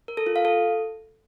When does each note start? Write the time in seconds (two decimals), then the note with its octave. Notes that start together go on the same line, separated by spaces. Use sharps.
0.08 A#4
0.17 A4
0.26 F4
0.36 F5
0.45 A4